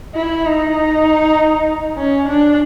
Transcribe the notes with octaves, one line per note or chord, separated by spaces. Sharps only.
E4
D#4
C#4
D4